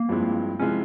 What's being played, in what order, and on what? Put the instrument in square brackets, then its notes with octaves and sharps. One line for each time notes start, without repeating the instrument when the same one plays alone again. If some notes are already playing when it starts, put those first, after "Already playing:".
Already playing: [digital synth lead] A#3
[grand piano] G2 F3 G#3 C4 E4
[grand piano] C3 F3 G#3 E4 [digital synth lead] C#4